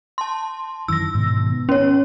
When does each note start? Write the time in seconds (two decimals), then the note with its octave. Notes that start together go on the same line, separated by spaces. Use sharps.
0.18 A5 C6
0.88 F#2 D#3 E3 E6 A#6
1.14 G#2 B2 D#3
1.52 B3
1.69 C#4 C#5